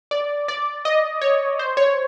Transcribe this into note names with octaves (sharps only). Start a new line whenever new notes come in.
D5
D5
D#5
C#5
C5
C#5